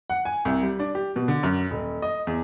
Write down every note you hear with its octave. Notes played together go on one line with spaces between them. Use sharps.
F#5
G#5
C2
G3
D4
G4
B2
D3
F#2
D#1
D#5
E2